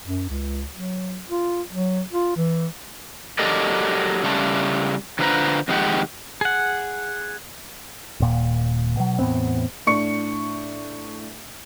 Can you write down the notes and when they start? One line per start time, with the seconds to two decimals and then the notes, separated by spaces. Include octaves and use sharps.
0.06 F#2
0.29 C#2
0.73 F#3
1.30 F4
1.69 F#3
2.11 F4
2.37 E3
3.39 F#3 G4 A4 A#4 D5 D#5
4.23 C#3 G3 A3 A5
5.19 D3 F#3 F4 B4 C5 A#5
5.68 F2 D#3 G#3 G4 F#5
6.41 G#4 F#5
8.20 D#1 A#2
8.97 B2 F#3
9.19 E2 A2 B3 C4
9.87 A2 D4 C#6 C#7